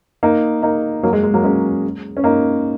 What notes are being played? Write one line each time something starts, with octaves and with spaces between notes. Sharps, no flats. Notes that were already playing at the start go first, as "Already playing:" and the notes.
A#3 D#4
A#3 D#4
F#3 A#3
G#3
G#3
F#3 A#3
G#3 C#4
C#4
A#3 D#4